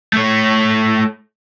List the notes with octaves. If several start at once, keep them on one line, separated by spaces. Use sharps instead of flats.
A3 C#5